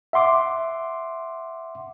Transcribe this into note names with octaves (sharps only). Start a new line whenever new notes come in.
E5 F#5 C6 D6